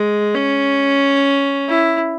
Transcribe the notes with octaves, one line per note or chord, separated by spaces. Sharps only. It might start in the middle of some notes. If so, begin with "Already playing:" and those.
Already playing: G#3
C#4
E4